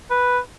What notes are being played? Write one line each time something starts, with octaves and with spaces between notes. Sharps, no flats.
B4